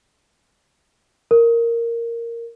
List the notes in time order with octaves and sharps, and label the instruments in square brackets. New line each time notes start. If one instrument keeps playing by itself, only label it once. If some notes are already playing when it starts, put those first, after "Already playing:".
[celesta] A#4